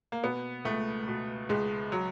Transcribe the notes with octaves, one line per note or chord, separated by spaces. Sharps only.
A#3
B2 B3
C#2 A3
B2
C#2 G#3
F#3